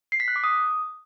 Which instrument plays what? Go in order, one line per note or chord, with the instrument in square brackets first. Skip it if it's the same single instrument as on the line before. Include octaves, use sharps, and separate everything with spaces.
[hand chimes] C7
B6
F#6
D6
D#6